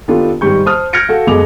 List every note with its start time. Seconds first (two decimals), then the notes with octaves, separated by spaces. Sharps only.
0.08 D#3 B3 D4 F4 G4 A4
0.41 G#2 D#3 G3 G4 C#6 G6
0.66 C5 A5 D#6 F6
0.93 F6 G6 G#6 A#6 C#7 D7
1.09 F#4 A4 F5
1.27 F#1 G#3 B3 A4 D6 F7